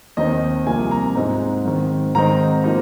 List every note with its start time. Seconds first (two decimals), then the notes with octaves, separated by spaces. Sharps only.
0.17 D#2 D#3 C4 D#4 D#5
0.66 C2 C3 F3 A#3 G#5
0.91 A#5
1.15 G#2 G#3 C4 D#4
1.65 G#2 D#3 C4
2.15 G#2 D#3 C4 D#4 A#5
2.64 F3 A#3 D#4